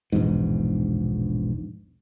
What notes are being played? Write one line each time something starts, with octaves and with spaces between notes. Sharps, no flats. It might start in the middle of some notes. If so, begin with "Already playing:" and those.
E1 A#1 E2 G#2